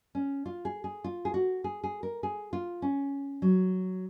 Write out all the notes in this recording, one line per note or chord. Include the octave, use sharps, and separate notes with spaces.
C#4
F4
G#4
G#4
F4
G#4
F#4
G#4
G#4
A#4
G#4
F4
C#4
F#3